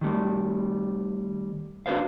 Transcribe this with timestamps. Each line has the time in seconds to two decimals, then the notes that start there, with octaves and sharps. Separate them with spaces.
0.01 D#3 G3 A3
1.86 D4 F#4 G4 B4 C5 F5